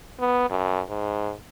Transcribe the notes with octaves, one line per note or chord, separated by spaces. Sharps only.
B3
F#2
G#2